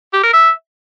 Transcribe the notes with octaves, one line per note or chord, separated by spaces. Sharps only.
G4
A#4
E5